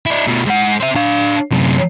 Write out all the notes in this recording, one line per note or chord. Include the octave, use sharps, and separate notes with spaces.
D4 E4
B2 A3
G#2 F#5
C4 E5
D4 F5
F#2 C3